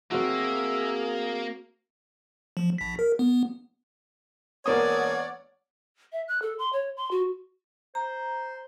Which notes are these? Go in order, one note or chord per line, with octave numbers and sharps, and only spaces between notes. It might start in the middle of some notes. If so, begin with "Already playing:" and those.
A#3 C4 F#4 G#4 E5
F3
A#1 B6
A#4
B3
E1 A#3 C#5 D5 F#5 D#6
E5
F#6
A4
C6
C#5
C6
F#4
C5 A#5